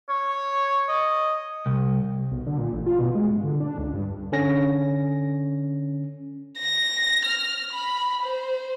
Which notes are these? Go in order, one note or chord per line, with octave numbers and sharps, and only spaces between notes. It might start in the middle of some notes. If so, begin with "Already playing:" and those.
C#5
D#5
C2
B1
D3
A#2
A1
F4
B2
G#3
G2
D3
D4
C#2
G2
D3 C#4 A#6
A#6
F6
B5
C5